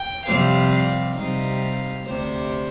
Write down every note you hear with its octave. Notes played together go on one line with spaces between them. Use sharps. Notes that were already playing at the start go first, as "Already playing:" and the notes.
Already playing: G5
F2 C3 G3 C4 F5
F5
C3 G3 C4 D#4 F5
D2 C3 G3 C5